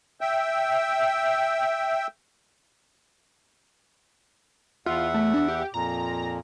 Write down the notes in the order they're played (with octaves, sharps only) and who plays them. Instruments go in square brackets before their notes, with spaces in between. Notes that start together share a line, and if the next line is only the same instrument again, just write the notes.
[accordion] E5 G5
[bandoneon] E2 E5 F#5 [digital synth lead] F4
[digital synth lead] A3
D4
G4
[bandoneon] F2 A#2 [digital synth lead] A#5